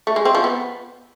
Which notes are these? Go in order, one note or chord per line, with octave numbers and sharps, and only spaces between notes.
A3
G#3
C4
F3
B3